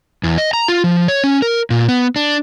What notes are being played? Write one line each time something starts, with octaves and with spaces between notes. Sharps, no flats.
E2
D#5
A#5
F4
F3
C#5
C#4
A#4
A#2
B3
D4